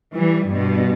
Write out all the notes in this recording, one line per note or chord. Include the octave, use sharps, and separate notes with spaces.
E3 G3
G2 B2